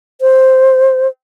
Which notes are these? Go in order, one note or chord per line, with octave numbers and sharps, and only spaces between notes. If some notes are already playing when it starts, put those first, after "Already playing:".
C5